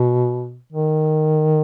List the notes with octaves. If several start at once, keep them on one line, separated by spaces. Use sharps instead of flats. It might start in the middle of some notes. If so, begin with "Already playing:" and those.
Already playing: B2
D#3